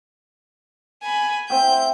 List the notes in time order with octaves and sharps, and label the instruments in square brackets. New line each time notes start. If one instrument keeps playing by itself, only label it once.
[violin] G#5 B5
[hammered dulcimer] C4 E5 G5 [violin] G6